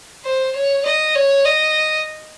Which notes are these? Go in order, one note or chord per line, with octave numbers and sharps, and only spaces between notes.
C5
C#5
D#5
C#5
D#5